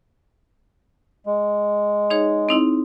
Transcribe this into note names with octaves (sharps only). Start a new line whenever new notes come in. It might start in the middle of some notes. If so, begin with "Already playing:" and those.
G#3
D#4 G#4 C#5
C4 D#4 E4